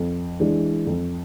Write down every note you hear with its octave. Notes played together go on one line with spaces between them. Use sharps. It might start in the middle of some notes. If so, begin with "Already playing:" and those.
Already playing: F2
E3 G#3 D4
F2